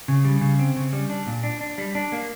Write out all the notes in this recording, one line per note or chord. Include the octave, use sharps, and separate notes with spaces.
C#3
G3
C#3
C4
C#3
G3
D4
A#2
D4
D4
G3
D4
A#3